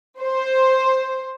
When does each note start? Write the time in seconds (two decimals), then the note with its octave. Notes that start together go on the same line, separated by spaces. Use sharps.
0.21 C5